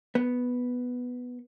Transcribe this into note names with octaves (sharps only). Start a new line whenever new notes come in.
B3